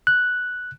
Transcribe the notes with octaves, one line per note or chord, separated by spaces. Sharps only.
F#6